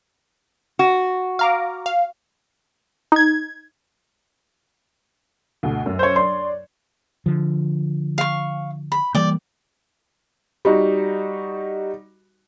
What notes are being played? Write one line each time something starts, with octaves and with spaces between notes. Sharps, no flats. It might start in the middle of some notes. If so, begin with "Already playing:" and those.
F#4
F5 A#5 D6
F5
D#4 G#6
D2 B2
F#2
C5 C#5
D4 C#5 D5 C6
D3 F3
F5 C#6
B5
E3 G3 A#3 D5 G5
G3 D#4 F#4